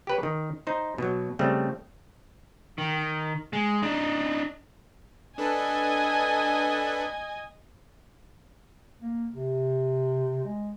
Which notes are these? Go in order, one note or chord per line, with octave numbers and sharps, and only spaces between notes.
G4 B4 C#5
D#3
D#4 C5
B2 F#3
C#3 G3 A3 C4
D#3
G#3
D4 D#4
D4 A4 B4 D#5 G#5
A#3
C3
G#3